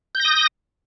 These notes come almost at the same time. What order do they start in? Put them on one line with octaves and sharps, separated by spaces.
G6 A#6 D#6